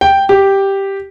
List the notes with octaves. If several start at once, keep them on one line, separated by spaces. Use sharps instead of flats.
G5
G4